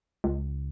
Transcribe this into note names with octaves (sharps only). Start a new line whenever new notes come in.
C#2